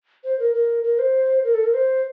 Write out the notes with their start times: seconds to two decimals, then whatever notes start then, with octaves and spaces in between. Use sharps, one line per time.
0.24 C5
0.39 A#4
0.54 A#4
0.84 A#4
0.99 C5
1.44 A#4
1.54 A4
1.64 A#4
1.74 C5